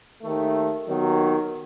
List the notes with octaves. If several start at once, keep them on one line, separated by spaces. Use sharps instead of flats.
D#2 D#3 A3
D#2 D#3 F#3 B3